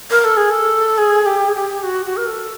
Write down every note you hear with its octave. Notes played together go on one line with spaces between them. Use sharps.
A#4
A4
G#4
A4
G#4
G4
G#4
G4
F#4
F#4
A#4
A4